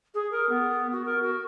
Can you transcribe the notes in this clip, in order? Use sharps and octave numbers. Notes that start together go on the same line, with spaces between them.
G#4
A#4
B3
F#4
A#4
F#4